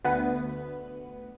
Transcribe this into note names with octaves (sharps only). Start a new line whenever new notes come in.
D2 B3 B4